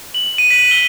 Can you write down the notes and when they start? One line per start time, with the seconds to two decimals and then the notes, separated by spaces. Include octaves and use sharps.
0.14 F#7
0.38 D#7
0.50 B6
0.71 G7